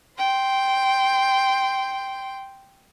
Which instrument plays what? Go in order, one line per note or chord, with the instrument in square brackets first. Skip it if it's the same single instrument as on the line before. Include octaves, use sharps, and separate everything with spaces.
[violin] G5 C6